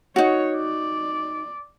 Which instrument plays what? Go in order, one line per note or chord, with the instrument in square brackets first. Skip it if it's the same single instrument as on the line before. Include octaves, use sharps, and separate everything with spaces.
[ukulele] D#4 F#4 [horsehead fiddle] C#5
[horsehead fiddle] D5